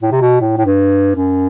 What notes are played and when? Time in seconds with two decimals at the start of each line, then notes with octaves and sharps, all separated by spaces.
0.02 A2
0.12 C3
0.21 B2
0.41 A2
0.57 A2
0.65 G2
1.15 F#2